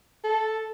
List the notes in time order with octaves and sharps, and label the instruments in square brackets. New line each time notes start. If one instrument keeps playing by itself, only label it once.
[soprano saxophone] A4